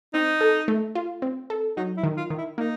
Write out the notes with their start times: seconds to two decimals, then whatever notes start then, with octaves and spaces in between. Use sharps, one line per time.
0.14 C4 D#4
0.41 A4
0.68 A3
0.95 F4
1.22 C4
1.50 A4
1.77 F#3 D#4
1.97 E4
2.03 D#3
2.17 F4
2.30 D#3
2.38 E4
2.58 A#3 D#4